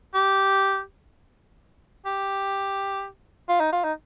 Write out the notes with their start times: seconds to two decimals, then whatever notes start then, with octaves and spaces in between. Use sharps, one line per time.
0.14 G4
2.06 G4
3.49 F4
3.60 D#4
3.72 F4
3.84 D#4